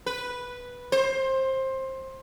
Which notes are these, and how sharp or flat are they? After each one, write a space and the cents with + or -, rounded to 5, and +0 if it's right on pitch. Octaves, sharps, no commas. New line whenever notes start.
B4 -5
C5 +20